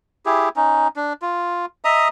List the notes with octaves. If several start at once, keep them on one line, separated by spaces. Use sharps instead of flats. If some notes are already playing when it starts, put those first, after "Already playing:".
E4 G4 G#4
C#4 D#4
D4
F4
D#5 E5 A#5 D#6